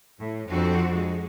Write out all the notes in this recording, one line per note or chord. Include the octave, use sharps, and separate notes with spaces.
A2
F2 C4 D4 F#4
G#3 F#4